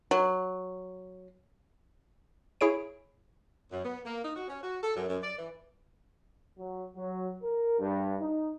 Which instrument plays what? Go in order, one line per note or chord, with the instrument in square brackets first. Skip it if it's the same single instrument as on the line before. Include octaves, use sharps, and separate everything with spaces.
[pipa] F#3
[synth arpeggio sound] E4 G#4 C#5 D7
[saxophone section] F#2
B3
A#3
D#4
F#4
C#4
F#4
A4
F#2
F#2
D5
E3
[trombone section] F#3
F#3
A#4
G2
D#4